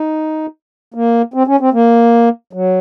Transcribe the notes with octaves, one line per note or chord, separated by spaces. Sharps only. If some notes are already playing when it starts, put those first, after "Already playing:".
Already playing: D#4
A#3
C4
C#4
C4
A#3
F#3